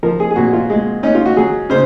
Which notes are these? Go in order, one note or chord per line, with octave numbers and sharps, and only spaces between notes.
F3 A#4
G#4
G#4
A#2 F#4
F4
G#3
C#4 D#4
F4
F#4
F#3 G#4
C#3 C5